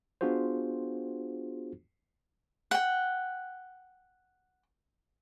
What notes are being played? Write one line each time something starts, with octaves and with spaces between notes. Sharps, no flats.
B3 D4 F4 F#4 G#4 C5
F#5 G5